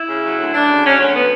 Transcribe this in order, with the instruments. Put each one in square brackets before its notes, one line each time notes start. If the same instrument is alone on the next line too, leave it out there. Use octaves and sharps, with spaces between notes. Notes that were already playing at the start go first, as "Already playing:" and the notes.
Already playing: [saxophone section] E4
C#3
F#3
D2
D2 D4
C#3
F#3 C#4
D2 C#4
B3